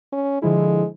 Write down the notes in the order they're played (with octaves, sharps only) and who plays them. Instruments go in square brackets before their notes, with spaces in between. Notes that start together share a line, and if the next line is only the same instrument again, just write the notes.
[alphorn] C#4
[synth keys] D3 F3 E4 [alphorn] G#3